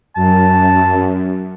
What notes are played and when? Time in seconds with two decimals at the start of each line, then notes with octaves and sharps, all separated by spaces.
0.16 F#2 A5